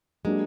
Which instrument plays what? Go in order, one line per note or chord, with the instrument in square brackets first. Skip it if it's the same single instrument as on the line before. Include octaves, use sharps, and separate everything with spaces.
[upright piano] F#3 A#3 D4 G4 [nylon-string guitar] G#3